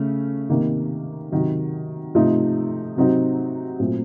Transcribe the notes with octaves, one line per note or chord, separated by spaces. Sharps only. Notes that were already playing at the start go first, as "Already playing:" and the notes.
Already playing: C#3 A3 C#4
C3 D#3 A#3
C3 D#3 F#3
C3 F3 A3 D#4
C3 F#3 C4 D#4
A#2 F#3 A3 C4